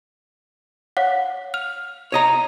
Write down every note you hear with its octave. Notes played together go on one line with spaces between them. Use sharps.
C#5 F5 F#5
F6 F7
C#5 D#5 A#5